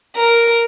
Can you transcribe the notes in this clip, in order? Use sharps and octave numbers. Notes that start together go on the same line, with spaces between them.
A#4